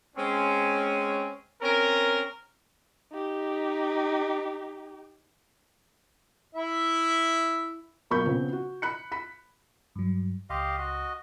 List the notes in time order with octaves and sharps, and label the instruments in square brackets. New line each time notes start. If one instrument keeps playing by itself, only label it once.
[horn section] G#3 C4 C#4
C4 C#4 A#4
[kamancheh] D#4 G4
[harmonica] E4 E5
[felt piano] D#1 B1 A#3 B5 C#6 G6
C#3 F3 B3 C4
F#4
B5 F#6 C#7
B5 B6
[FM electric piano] G2 F#3
[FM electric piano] C#2 C6 [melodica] G4 D#5 F5
[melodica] F#4 D#5